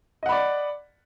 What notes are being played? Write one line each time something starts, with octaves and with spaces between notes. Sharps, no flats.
D5 D#5 F#5 B5